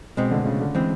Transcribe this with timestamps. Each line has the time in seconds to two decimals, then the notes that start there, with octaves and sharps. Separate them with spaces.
0.17 B2 G#3 C4
0.31 D3
0.46 C#3
0.60 D3
0.75 E3 G#3 C4